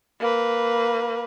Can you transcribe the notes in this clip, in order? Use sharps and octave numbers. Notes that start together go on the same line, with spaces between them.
A#3 B4